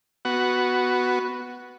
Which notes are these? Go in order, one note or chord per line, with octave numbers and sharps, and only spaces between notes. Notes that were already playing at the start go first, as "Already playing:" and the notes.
B3 F#4